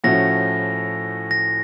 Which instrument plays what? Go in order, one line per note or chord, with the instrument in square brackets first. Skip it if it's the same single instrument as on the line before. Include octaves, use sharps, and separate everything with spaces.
[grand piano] A2 F3 A3 C#4 F#4 [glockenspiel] A#6
[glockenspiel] A#6